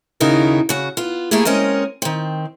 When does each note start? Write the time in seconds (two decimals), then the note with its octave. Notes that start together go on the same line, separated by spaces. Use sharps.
0.20 D#2 C#3 D#4 E4 F#4 A#4
0.69 C#3 F#4
0.97 B3 F4
1.31 A3 A#3 E4 G4 G#4
1.45 G#3 C4 C#4 A#4 D#5
2.02 D#3 C4